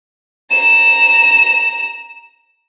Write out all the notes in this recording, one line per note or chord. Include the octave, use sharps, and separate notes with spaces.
A#5 E7